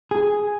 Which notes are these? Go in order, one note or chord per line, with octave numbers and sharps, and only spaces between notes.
G#4